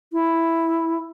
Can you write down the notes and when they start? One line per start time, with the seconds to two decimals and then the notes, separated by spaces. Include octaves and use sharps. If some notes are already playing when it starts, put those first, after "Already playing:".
0.13 E4